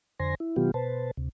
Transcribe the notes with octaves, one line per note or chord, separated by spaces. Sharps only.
F2 D3 C5 G#5 C6 A#6
E4
B2 D#3 F#3 B3 F4 G4
B2 B4 C5 A5
D2 C3